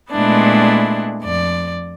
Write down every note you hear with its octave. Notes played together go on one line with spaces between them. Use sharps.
A#2 G#3 A3 B3 D4 E4
F2 D5